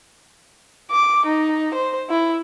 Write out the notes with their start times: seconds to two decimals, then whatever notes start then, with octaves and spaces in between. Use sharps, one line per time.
0.91 D6
1.26 D#4
1.74 C5
2.10 E4